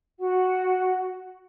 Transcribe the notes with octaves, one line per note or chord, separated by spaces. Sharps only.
F#4 F#5